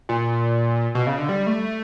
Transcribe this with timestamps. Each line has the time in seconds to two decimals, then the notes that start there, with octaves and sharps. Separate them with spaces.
0.09 A#2
0.95 B2
1.07 C#3
1.18 D3
1.29 G3
1.47 A3